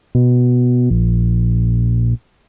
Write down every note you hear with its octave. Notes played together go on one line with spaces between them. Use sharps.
B2
A#1